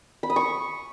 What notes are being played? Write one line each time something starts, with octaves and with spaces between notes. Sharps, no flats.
B5
D#6
C#6